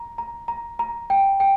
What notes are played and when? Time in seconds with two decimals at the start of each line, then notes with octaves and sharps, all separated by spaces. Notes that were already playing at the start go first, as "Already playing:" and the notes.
Already playing: A#5
0.18 A#5
0.48 A#5
0.79 A#5
1.10 G5
1.40 G5